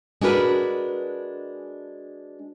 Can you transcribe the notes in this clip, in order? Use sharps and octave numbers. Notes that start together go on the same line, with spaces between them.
G#3 D4 F#4 A#4 B4